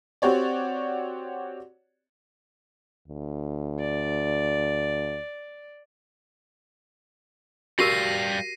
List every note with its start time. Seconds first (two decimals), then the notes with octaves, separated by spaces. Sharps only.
0.22 C4 F#4 G4 C#5 D5
3.08 D2
3.80 D5
7.79 G3 F#4 G4 A#4 F5 A#6 C7 D#7